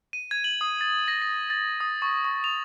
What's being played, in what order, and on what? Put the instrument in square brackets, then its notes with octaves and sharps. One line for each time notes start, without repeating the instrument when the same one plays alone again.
[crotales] D#7
G#6
F#7
D#6
A6
A#6
A#6
A6
D#6
C#6
C#6
F7